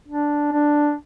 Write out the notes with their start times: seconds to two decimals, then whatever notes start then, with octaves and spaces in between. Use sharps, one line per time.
0.08 D4
0.52 D4